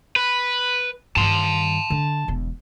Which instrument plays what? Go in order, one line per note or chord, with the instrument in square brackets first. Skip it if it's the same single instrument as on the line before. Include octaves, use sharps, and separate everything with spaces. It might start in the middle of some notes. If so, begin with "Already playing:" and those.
[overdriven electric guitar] B4
[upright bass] G2 D#3 [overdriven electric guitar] A5 C6
[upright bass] D3 D4
E1 E2